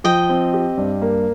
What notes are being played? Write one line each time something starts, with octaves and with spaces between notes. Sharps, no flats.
F3 D#5 G5
C4
G4
G2
A#3